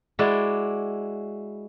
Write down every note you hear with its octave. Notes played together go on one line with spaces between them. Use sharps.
G#3 E4 F#4 D5